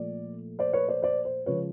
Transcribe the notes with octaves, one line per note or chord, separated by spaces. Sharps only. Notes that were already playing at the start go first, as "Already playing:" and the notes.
Already playing: A#2 F3 A3 D5
C5 D5
B4 C#5
C5 D5
C5 D5
C5
C#3 F3 G#3 B4 C#5